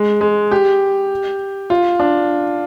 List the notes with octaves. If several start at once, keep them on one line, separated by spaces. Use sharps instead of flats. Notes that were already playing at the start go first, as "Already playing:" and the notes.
Already playing: G#3
G#3
G4
F4
D4